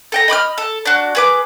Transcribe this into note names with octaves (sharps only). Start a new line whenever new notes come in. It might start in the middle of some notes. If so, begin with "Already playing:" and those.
A4 G5 A#5
D#5 B5 D6 F6
A4
D4 F#4
G#4 B4 D6